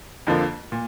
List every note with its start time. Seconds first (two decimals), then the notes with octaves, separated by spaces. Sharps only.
0.27 F2 D3 F3 A#3
0.72 A#2